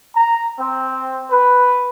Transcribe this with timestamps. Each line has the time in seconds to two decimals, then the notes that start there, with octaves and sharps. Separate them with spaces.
0.16 A#5
0.60 C4
1.32 B4